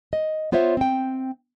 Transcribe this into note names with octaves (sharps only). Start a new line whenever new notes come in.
D#5
B3 F4 C5 C#5 E5
C4 G5